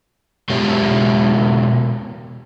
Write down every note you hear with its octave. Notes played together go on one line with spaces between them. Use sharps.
B2 G#3 F4 G4 C#5 E5